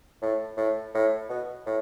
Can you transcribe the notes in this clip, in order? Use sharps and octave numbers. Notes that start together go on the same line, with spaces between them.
A2
A2
A2
B2
A2